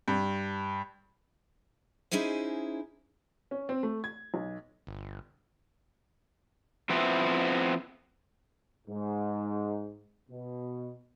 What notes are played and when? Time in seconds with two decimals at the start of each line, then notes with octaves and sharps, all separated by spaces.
0.08 G2
2.11 C#4 D#4 E4 G#4 C5
3.51 C#4
3.69 C4
3.83 A3
4.04 G#6
4.34 B1
4.87 G1
6.89 F3 B3 C4 E4
8.87 G#2
10.30 B2